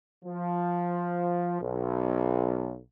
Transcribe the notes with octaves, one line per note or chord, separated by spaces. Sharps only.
F3
B1